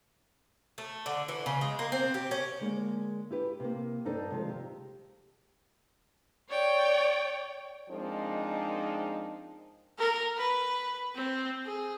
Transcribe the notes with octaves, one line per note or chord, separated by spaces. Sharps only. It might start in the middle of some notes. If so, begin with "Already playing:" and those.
A3
D3
E3
C#3
G#3
A#3
C4
G4
C#4
D3 G#3 A#3
E4 G4 B4
C3 A#3
G2 D#4 A4 C5 D5
C3 D#3 F3 G#3
G4
C#5 D5 G5
F3 G#3 C4 D4 D#4 A#4
A#4
B4
C4
G#4